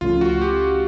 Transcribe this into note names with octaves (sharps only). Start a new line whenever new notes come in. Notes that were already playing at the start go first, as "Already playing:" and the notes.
C#2 C#3 F3 A3 C#4 F4
F#4
G4